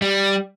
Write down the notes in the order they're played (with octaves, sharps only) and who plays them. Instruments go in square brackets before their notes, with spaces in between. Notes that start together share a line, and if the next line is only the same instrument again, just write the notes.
[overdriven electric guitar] G3